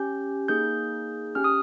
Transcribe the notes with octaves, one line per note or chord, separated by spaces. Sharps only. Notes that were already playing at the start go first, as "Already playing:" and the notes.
Already playing: C#4 G4 G6
A#3 D#4 G#4 G6
C#4 G4 F6
D#6